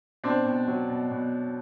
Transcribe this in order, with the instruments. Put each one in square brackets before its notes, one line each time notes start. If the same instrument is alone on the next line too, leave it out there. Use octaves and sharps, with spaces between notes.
[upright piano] B2 C4 D4
B2
F#3
B2
B2